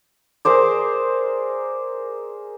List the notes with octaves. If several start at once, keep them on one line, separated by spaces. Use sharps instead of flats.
G#4 A#4 C5 D5